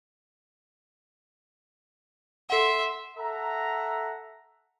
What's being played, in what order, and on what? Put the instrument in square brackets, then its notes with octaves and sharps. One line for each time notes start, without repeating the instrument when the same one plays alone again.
[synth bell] A4 F#5 [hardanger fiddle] E5 C6
[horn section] A4 E5 F#5 A#5